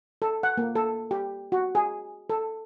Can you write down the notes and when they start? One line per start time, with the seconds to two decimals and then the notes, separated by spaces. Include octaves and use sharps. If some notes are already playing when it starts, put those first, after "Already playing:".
0.22 A4
0.43 F#5
0.57 A#3
0.75 A4
1.11 G4
1.52 F#4
1.75 G#4
2.30 A4